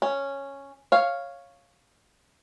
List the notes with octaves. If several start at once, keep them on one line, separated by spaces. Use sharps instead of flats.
C#4
C#5 F5